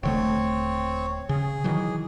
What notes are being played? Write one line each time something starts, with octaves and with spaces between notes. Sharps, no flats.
D#1 D3 A3 C4 C#5
C#3 G#4
D#3 E3 F#3